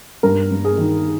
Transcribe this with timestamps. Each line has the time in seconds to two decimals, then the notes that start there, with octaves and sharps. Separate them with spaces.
0.23 G2 A#4
0.51 G2
0.64 G#4
0.78 D#3